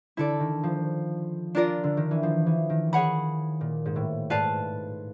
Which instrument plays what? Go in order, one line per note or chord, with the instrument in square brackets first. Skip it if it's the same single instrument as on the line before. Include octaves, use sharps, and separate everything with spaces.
[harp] D3 [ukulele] E4 A4 D5
[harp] D#3
F3
[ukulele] D4 F4 A#4 D5
[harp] D3
D#3
E3
F3
E3
D#3
[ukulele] G#4 C#5 F#5 B5
[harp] A#2
G#2
A2
[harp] G#2 [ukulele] B4 D5 F5 A5